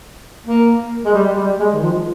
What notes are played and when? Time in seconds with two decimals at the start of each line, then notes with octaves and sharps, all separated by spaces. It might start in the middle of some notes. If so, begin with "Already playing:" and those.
0.46 A#3
1.05 G#3
1.14 G3
1.37 G3
1.60 G#3
1.73 D#3
1.82 F3